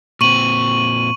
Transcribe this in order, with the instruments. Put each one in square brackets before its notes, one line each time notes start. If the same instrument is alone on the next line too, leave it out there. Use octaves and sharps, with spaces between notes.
[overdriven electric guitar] A#2 C4 [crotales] C#6 D#7 F#7